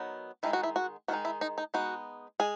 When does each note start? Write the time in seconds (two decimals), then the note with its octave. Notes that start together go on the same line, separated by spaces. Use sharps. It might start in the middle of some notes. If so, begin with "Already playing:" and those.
Already playing: D#3 F#3 B3 D#4
0.43 D#3 G#3 D#4 E4
0.53 F#4
0.63 E4
0.76 F#4
1.08 D#3 G#3 D#4 F#4
1.25 E4
1.41 D#4
1.58 D#4
1.74 G#3 B3 D#4 F#4
2.40 G#3 G#4